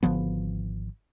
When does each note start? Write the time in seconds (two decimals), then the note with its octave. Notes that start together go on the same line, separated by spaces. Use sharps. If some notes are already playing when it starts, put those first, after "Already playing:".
0.03 G#1 D3 F3 B3